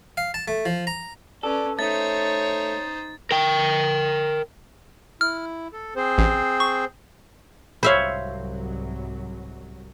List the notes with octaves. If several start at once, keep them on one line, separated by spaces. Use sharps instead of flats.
F5
A5
A3
F3
A#5
C#4 A4 B4 D5
A3 D#4 C5 C#5 A6
A#4 G5
E4 F6
A4
C4 G#4 C5
A1
C#6
C2 G#2 F#3 C5 C#5 E5 F5 B5